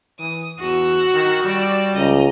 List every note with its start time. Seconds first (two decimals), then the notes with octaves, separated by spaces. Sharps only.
0.19 E3 D#6
0.60 E2 F#4 F#5 E6
1.14 D#3
1.44 G3 D5 E6
1.96 C#2 D#5 A#5